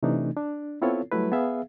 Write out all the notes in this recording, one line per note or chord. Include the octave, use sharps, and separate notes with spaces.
C3 E3 A3 D4 D#4
D4
B3 C4 E4 F4 A4 C#5
F#3 G3 A3 E4 B4
B3 G#4 E5 F5